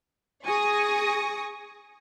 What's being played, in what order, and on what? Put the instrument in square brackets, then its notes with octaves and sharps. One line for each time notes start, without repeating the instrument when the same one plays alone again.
[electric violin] G#4 G#5 [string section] C#6 D#6 A#6